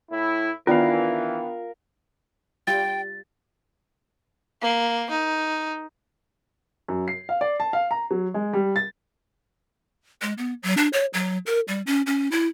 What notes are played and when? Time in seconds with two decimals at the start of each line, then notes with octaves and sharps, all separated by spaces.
0.11 A2 E4
0.67 D#3 E3 B3 D4 F4 A#4 F5
2.67 G3 F4 G5 A6
4.61 A#3
5.10 D#4
6.88 F#2
7.08 C7
7.29 F5
7.41 D5
7.60 A5
7.73 F5
7.91 A#5
8.11 F#3
8.34 G#3
8.53 G3
8.76 A6
10.22 G#3
10.38 B3
10.63 F#3
10.77 D4
10.93 C#5
11.14 F#3
11.46 A#4
11.68 G3
11.87 C#4
12.06 C#4
12.31 E4